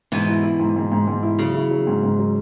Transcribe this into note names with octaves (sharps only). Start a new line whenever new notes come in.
G#2 B2 E3
E4
E4
G#2
G#2
G#2
G#2
E4
C#3 F#3
E4
F#3
G#2
G#2
F#3